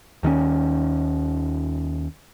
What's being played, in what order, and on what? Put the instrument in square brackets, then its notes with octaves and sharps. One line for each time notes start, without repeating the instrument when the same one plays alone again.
[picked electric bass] D#2 D#3 A3 C#4